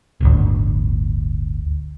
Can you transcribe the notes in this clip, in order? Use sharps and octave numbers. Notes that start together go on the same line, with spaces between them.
D1 G1 D2